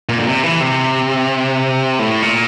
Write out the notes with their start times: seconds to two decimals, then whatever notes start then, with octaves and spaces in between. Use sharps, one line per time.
0.09 A#2
0.18 D3
0.27 C3
0.44 E3
0.60 C3
1.99 A2
2.22 A#2